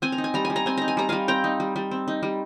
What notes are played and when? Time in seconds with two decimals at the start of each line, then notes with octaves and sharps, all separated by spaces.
0.02 C4 G#5
0.12 A#5
0.18 D#4
0.24 G#5
0.34 G3 A#5
0.45 G#5
0.50 G3
0.56 A#5
0.66 C4 G#5
0.77 D#4 A#5
0.88 G#5
0.97 G3 A#5
1.09 G3 F5 G#5
1.28 C4 G5 A#5
1.44 D#4
1.60 G3
1.76 G3
1.91 C4
2.08 D#4
2.23 G3